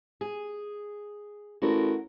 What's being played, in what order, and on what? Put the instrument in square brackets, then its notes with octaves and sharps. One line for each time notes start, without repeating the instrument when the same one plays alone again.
[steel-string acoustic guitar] G#4
[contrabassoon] A1 [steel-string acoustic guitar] F#4 A#4